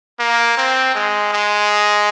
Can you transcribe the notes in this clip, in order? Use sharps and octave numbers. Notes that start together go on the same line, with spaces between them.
A#3
C4
G#3
G#3